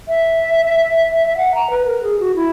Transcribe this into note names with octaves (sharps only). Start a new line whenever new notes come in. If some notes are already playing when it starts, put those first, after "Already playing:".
E5
F#5
A#5
B4
A#4
G#4
F#4
E4